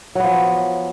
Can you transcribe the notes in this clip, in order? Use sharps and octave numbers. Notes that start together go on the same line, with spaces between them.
F3 F#3 B3